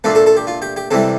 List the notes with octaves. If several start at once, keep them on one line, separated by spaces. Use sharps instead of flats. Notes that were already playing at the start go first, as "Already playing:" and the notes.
A#2 A3 D4 F4 A4
A4
A4
G4
F4
G4
G4
C3 E3 G3 A4